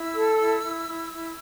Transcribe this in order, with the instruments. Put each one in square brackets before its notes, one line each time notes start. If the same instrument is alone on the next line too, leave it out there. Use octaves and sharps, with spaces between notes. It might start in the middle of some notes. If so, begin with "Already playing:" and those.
Already playing: [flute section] E4 E6
A4
E4
E4
E4
E4